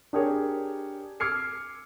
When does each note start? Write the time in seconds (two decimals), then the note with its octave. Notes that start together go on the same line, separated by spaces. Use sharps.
0.13 D4 G4 G#4 A#4 C#5
1.20 D6 E6 F6 G#6 C7 C#7